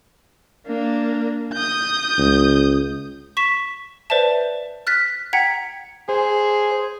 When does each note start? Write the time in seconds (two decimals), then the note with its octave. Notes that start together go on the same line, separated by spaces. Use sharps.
0.67 A#3 D4
1.54 D#6 G6
2.18 C#2
3.37 C#6 B6 E7
4.10 B4 C5 D5 E5 A5
4.87 F6 F#6 A6 B6
5.33 F#5 G5 A#5 G#6 B6 C#7
6.09 G#4 C5